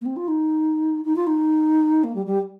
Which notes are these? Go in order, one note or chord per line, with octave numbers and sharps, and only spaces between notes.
A#3
C4
F4
D#4
D#4
F4
D#4
A#3
G3
G3